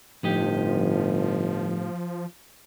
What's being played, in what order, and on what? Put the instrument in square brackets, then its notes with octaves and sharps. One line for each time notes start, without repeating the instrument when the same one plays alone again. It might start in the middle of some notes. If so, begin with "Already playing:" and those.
[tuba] G1 [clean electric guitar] A2 D#4 G4 [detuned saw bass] F3